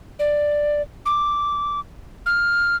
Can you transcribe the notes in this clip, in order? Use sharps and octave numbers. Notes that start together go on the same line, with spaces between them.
D5
D6
F6